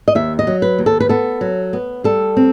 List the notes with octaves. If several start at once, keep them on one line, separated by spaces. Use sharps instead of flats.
D#5
D#2 E5
D#5
F#3
B4
D#2
A4
B4
B3 A4
F#3
B3
G3 A4
C4